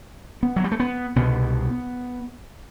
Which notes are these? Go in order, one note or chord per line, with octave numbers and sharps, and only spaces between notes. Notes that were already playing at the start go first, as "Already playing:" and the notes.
B3
F#3
G3
A3
B3
C2 B2 B3